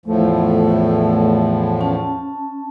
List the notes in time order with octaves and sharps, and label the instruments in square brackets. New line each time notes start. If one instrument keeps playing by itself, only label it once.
[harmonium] E2 A2 F3 [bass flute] A3
[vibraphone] C#4 A5